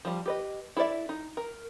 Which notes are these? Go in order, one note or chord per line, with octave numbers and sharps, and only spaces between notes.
F3 G3
G4 B4 D#5
E4 A4 C5 D5 E5
D#4
A#4